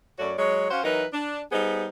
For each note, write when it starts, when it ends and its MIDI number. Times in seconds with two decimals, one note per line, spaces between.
0.19 0.32 42
0.19 0.32 57
0.19 0.32 66
0.19 0.32 73
0.19 0.32 74
0.38 0.70 54
0.38 0.70 56
0.38 0.70 73
0.71 0.82 61
0.71 0.82 66
0.71 0.82 72
0.71 0.82 77
0.84 1.05 52
0.84 1.05 54
0.84 1.05 63
0.84 1.05 70
0.84 1.05 71
1.13 1.40 62
1.52 1.87 55
1.52 1.87 59
1.52 1.87 63
1.52 1.87 68
1.52 1.87 72